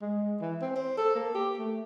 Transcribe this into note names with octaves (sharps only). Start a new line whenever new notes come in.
G#3
E3
C4
C5
A4
A#3
G4
A3